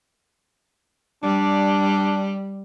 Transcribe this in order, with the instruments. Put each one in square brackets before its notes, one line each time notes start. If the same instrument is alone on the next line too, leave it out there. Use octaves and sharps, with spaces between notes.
[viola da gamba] G3 [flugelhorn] D4